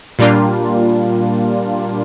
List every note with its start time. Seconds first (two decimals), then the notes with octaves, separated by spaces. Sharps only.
0.19 A#2 G3 A#3 D4 F4